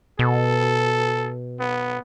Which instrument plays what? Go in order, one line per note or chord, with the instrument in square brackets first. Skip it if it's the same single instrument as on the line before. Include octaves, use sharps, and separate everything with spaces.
[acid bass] B2 [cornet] A4
[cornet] B3